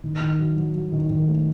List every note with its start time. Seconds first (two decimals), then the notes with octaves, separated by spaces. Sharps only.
0.04 D#3
0.21 D#3
0.39 F#3
0.57 F#3
0.75 F#3
0.92 D#3
1.10 D#3
1.28 A3